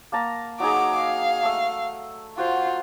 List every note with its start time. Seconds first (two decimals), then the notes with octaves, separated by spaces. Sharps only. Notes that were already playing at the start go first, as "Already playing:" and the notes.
0.12 A#3 A5 A#5
0.60 F#3 D#4 G#4 A#5 D6
0.96 F5
1.43 A3 E6
2.38 F4 F#4 C5